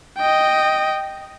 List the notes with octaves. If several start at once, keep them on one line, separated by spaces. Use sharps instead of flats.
D#5 G5